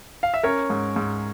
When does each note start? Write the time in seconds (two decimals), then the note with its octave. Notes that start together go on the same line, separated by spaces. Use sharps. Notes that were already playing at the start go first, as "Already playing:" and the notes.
0.23 F5
0.34 E5
0.43 C#4 A#4 C#5
0.70 G#2
0.96 G#2